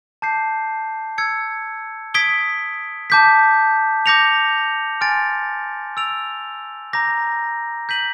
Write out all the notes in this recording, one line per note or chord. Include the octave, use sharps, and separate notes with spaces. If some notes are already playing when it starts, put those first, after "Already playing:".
A5 D6 G6 C7
E6 G#6 C#7
D#6 G#6 B6 D7 G7
A5 D6 G6 B6
D6 G6 A#6 C#7 F7
G#5 C6 F6 A6 D7
E6 A6 D7 F7
A#5 D6 G6 A#6
G6 B6 D#7 F#7